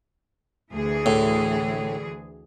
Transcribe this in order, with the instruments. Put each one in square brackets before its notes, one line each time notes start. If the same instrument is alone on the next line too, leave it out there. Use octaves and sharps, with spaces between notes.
[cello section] D2 E3 G#4
[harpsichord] A2